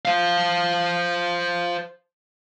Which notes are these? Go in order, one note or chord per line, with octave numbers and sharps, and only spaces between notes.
C5 F5